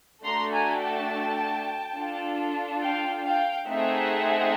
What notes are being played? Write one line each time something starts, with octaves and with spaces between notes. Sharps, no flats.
A3 D4 F#4 A4 A#5 C6
G#5 A#5
G5 A5
D4 F4 A4
F5 G5
F5 G5
A3 C4 D#4 G#4 E5 F#5